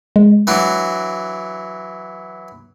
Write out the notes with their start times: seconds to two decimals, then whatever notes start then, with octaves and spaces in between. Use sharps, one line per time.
0.16 G#3
0.47 E3 F#3 D4